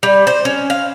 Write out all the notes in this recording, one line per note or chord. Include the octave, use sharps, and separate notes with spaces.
G3
C5
C#4
F5